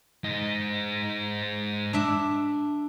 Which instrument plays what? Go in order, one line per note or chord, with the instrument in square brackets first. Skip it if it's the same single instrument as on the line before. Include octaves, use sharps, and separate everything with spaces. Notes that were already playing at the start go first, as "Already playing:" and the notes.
[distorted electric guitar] G#2 D#5
[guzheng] D4 E5